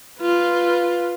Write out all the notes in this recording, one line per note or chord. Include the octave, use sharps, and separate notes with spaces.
F4 B4